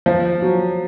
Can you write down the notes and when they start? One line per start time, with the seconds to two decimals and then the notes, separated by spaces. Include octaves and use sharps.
0.06 F3
0.42 F#3